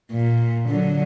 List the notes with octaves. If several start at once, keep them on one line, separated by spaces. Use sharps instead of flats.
A#2
D3 F#3